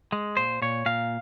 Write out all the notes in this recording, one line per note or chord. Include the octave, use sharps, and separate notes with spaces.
G#3
A#2 C5
A#2 C#5
A#2 F5